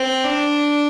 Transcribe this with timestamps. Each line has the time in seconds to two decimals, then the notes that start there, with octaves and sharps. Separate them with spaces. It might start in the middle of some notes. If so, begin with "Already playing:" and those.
Already playing: C4
0.24 D4